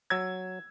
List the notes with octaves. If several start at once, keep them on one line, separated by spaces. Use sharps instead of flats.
F#3 E6 G#6